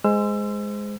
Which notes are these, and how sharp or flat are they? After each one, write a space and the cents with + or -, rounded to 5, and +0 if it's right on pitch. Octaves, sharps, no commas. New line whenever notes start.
G#3 +0 C5 -20 E6 +30